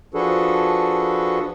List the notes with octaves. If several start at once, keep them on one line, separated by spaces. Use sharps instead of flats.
F3 D4 F#4 G#4 A4 B4